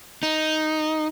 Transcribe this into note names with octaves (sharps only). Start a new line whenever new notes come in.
D#4